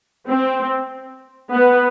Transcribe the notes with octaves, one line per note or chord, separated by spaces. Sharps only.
C4
B3